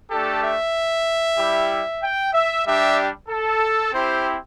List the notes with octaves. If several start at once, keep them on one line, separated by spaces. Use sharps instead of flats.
A3 D4 G4 A4
E5
G3 E4 G4
G5
E5
G3 D4 G4 E5
A4
C4 E4 G4 C5